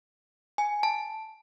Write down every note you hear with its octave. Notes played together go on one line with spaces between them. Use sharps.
G#5
A5